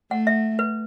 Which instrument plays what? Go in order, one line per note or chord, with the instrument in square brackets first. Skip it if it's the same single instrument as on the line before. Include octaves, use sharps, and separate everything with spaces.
[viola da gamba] A3 [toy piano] F#5
[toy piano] E5
B4